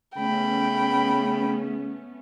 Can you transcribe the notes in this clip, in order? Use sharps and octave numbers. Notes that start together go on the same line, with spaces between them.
C#3 A3 B3 C#4 G5 B5